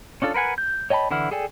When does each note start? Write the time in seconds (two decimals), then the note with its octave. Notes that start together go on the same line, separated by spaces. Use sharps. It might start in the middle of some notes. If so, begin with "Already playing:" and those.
0.22 C#4 D4 F4 A4
0.34 A#4 B4 F#5 G#5
0.58 G6
0.90 C#5 D#5 G5 A5 B5
1.11 D3 E3 E4 F#5 F6
1.31 G#4 A4 D5 G5 G#5